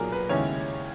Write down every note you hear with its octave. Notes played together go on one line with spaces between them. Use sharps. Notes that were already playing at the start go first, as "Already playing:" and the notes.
Already playing: B1 A#2 F#3 G#4 A#4
B4
D#2 C#3 G#3 C#4 E4 C#5